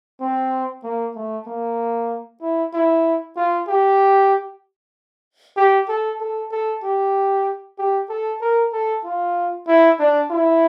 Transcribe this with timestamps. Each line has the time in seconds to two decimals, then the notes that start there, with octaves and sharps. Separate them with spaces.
0.21 C4
0.84 A#3
1.15 A3
1.47 A#3
2.42 E4
2.74 E4
3.36 F4
3.68 G4
5.57 G4
5.89 A4
6.20 A4
6.52 A4
6.83 G4
7.79 G4
8.09 A4
8.41 A#4
8.73 A4
9.04 F4
9.68 E4
9.99 D4
10.31 E4